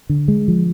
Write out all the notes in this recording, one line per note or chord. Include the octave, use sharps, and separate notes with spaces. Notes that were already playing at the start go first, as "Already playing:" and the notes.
D3
G#3
F3